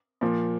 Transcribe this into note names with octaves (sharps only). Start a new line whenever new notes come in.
A#2 F3